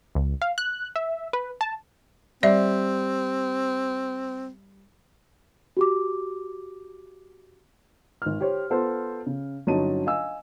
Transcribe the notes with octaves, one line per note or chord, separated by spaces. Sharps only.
C#2
F5
F#6
E5
B4
A5
G3 C4 D5 E5
F#4 G4 D6
G#1 F6
G4 C5 C#5
B3 F4 A4 C5
C#3
G1 F#3 C#4 D#4 A5 D#7
D#5 F5 G#5 E6